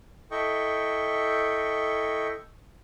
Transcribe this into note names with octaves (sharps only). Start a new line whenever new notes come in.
E4 A4 D#5 G5 C#6